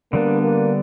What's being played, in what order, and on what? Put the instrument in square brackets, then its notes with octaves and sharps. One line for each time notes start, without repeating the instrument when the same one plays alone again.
[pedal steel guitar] D3 G3 B3 D4 [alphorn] A#3
[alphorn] A#3